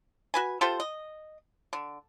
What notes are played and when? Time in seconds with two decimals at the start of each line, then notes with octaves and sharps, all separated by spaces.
0.34 F#4 B4 G#5
0.61 F4 G4 A4 C5
0.80 D#5
1.73 D3